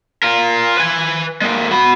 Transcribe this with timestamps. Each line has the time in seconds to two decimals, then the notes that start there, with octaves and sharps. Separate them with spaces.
0.23 F4 A#4
0.77 B4 G#5
1.42 G#3 A#3
1.71 F#4 B5